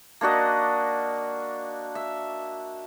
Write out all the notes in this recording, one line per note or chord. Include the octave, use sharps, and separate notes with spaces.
A#3 D4 F#4 D#5
E5